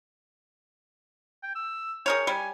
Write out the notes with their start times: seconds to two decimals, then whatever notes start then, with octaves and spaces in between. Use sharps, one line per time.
1.43 G5
1.55 E6
2.06 G#4 A#4 C#5 G5
2.27 G3 G#5